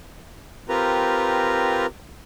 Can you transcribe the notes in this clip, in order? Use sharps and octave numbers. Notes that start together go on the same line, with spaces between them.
C4 F4 G4 A#4 B4 A#5